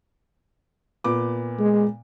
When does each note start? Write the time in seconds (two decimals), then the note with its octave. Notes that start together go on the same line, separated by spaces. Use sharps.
1.04 A#2 B3 D6
1.59 G#3